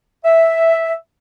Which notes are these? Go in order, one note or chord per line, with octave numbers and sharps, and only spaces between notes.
E5